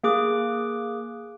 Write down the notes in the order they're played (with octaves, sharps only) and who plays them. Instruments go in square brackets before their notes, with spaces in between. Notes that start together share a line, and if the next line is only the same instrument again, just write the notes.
[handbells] A#3 G#4 D6 F#6